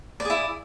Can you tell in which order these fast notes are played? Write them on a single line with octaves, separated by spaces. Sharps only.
D5 G#4 E4